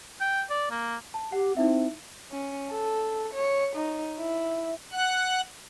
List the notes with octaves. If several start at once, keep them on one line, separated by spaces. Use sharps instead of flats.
G5
D5
A#3
A5
G4 F#5
C4 D#4 E4 E5
C#4
A4
C#5
D#4
E4
F#5 F#6